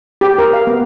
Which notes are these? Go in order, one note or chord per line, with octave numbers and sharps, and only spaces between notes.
G4
A#4
F5
B3